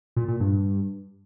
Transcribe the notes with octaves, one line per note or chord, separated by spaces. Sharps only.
A#2
A#2
G2